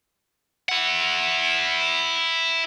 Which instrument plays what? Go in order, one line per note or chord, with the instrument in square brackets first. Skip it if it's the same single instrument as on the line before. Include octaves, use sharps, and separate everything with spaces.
[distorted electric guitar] E4 F#5